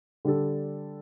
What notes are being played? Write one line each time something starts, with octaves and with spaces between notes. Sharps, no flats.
D3 G3 D4 A4